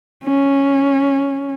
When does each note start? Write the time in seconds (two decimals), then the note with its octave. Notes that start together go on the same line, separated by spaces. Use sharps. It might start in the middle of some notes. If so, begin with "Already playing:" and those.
0.24 C#4